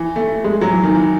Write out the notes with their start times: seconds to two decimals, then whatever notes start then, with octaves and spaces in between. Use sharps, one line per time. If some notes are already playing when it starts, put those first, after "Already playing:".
Already playing: E3
0.16 A3
0.28 A3
0.44 G#3
0.61 F#3
0.72 E3
0.83 D#3
0.95 E3